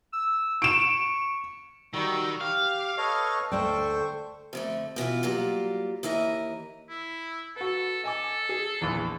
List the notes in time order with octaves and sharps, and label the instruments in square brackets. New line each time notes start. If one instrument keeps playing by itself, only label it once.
[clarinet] E6
[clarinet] C#6 [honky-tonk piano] D7 E7
[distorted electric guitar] D#3 [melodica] G3 F#4 E6
[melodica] G4 [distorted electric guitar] F5
[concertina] D6
[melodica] A4 D#5 C#6 [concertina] B4 C#5
[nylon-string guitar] D2 A3 D5 [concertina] A4 G5 [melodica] C5 C#6
[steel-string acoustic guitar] F2 D3 A3
B2 E3 E4 F4
F#3 G3 A#3 F4
D#2 E3 E4 A#4 D#5
[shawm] E4
[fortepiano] F#4 B4 [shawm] A4
[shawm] A4 [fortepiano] D#5 G#5 D6
[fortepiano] G#4
A#1 E2